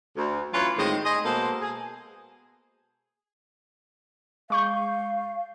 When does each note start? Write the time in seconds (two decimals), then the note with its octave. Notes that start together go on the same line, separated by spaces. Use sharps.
0.16 D2
0.53 E3 F#3 C#4 F4 B4
0.77 A2 D#3 G#3 C4 D#5
1.05 G#4 C5 D#5
1.24 B2 G#3 A#3 A4 C5
1.61 G#4
4.50 G#3 F5 C#6 G6